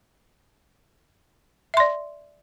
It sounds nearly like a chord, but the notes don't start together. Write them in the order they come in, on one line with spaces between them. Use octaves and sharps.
E5 C6 D5